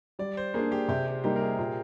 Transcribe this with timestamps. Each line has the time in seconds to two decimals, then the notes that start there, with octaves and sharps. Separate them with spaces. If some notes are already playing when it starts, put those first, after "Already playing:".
0.19 G3 D5
0.37 C5
0.54 A#3 D4 G#4
0.72 G4
0.88 C3 G4
1.07 G4
1.24 G3 A#3 D#4 G4
1.36 A#4
1.42 G#4
1.58 A#2